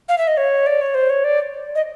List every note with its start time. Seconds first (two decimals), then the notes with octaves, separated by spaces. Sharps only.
0.09 F5
0.18 E5
0.27 D#5
0.37 C#5
0.66 D5
0.81 C#5
0.95 C5
1.10 C#5
1.24 D5
1.75 D#5